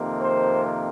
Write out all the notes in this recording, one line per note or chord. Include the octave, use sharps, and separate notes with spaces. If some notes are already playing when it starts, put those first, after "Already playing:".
Already playing: F2 C3 D#3 A#3
C5